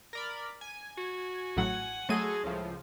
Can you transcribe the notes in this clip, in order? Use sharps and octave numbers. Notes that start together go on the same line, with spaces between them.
A#4 D5 B5
G#5
F#4
A1 A2 F#3 F#5
F#3 G#3 A3 F#4 G#4 A4 D#7
C#2 A2 F3